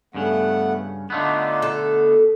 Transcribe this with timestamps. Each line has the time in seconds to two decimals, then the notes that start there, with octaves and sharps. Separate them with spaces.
0.15 G2 C#3 A3 B3 F#5
1.10 D3 A3 B3 D4 D#4 F4
1.62 A4
1.86 B2